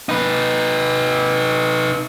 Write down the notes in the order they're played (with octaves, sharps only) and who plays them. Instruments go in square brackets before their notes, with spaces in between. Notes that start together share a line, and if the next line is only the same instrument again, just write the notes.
[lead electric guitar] D#4 B4